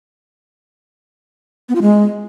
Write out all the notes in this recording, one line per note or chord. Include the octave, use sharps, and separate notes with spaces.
B3
F4
G#3